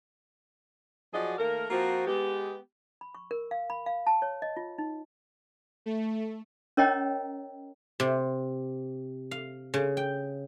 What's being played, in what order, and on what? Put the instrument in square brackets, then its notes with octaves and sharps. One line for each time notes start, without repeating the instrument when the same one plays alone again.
[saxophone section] F3 F#3 F#4 G#4 D5 D#5
D#3 A3 A#3 A#4
F3 A#3 C4 F4 F#4
G#3 B3 G4
[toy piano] B5
C#6
A#4
F5
B5
F5
A5
C#5
D#5
F4
D#4
[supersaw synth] A3
[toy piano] C#4 A#4 C#5 D#5 G5 A#5
[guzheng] C3
F5
C#3
G5